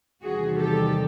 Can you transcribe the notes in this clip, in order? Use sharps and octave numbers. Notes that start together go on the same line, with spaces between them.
E2 C3 D#3 G3 F#4 G#4
G4 A4